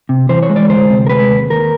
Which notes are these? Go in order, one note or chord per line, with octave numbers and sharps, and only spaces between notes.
C3
E3 C5
C#5
G#3
D5
D2 C5
C3
A#4
G#3 B4
D#2
D#2 A#4